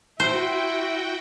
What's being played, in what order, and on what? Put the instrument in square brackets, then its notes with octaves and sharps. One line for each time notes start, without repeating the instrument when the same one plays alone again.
[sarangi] E4 [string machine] F#4 G5 [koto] C5